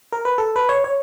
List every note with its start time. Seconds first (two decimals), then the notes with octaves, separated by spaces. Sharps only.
0.13 A#4
0.25 B4
0.38 A4
0.56 B4
0.69 C#5
0.84 C#5